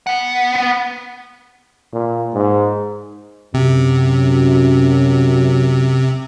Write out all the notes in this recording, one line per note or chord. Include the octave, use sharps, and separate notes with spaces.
B3 F#5
A#2
G#2
F#2 C3